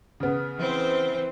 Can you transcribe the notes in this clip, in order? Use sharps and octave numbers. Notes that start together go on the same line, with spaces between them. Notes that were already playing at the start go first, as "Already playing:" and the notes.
C#3 B3
E3 C4 C5